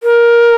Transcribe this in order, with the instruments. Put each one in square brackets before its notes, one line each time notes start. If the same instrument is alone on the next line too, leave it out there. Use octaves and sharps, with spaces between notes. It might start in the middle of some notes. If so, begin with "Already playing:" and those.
[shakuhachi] A#4